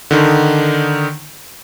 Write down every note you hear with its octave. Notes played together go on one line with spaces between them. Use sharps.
D3 D#3 D#4